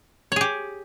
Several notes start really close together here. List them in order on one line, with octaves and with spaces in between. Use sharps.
C#5 G#4 G4